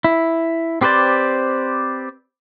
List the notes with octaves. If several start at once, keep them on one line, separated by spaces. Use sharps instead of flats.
E4
C4 G4 B4 C5 D5